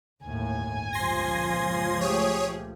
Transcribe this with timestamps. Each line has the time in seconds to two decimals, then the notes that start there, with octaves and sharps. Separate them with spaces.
0.22 G1 D#2 A2 G#5
0.93 C#2 A#2 F3 C6 G#6 A#6
2.01 A3 G4 G#4 C#5 D#6